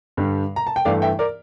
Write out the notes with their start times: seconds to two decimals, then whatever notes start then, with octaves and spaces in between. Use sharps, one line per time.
0.17 G2 D3 G3
0.56 A#5
0.67 A5
0.76 G5
0.85 G2 E3 A3 D5 F5
1.02 E5 G5
1.19 A#4 D5